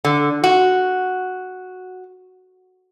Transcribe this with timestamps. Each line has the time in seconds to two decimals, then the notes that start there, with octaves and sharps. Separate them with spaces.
0.05 D3
0.44 F#4